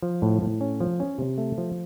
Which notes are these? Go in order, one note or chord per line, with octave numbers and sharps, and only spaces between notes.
F3
A2
A2
C#4
F3
C#4
C3
A3
F3